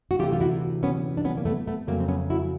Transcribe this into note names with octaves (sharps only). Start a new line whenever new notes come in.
F#4
D2 C3 E3 A3 F4 G4
F4
E4 F#4
B3 C#4
D4
B3 C#4
A#3
A3 B3
A3 B3
F2 C#3 F#3 A3 A#3 C4
C4
B3 C#4
E4 F#4